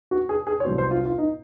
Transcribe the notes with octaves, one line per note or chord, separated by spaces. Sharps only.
F#4
G#4
G#4
C#5
C2 C3 F#3 C5
C5
F4
F4
D#4